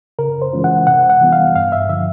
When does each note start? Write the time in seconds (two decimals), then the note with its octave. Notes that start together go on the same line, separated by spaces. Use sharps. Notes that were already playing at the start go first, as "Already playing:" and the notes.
0.19 C#3 A#4
0.42 C5
0.53 E3 G#3 C#4 F4
0.64 F#5
0.87 C3 F#5
1.10 F#5
1.21 E3 G3 B3
1.33 F5
1.55 G2 F5
1.72 E5
1.89 D3 F3 E5